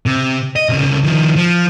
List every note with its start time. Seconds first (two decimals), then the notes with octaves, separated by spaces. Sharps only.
0.06 C3
0.56 D#5
0.69 C2 C#3
1.04 D#3 F3
1.36 F3